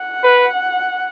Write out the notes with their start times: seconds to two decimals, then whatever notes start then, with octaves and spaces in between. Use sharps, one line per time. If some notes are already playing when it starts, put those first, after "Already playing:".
Already playing: F#5
0.24 B4